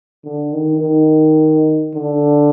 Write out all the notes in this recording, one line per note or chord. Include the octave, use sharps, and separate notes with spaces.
D3
D#3
D#3
D3